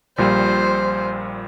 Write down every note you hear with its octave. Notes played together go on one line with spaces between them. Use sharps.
A#1 A#2 G3 C5